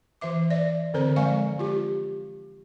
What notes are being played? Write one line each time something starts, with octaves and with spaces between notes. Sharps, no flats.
E3 C5 E5 D6
D5 E5
D3 C4 A4 C5 A#5
F3 G#3 D5 F5 G#5 C#6
F4 G4